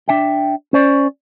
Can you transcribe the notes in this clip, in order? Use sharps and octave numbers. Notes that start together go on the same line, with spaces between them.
D4 E5 G5
C#4 C5 D5